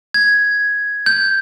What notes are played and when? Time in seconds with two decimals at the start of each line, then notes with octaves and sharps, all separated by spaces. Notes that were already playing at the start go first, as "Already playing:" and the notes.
0.14 G#6
1.06 G6